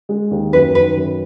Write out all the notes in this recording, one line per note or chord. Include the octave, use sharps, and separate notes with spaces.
G#3
D#2
F#2 B4
D#3 B4
F#2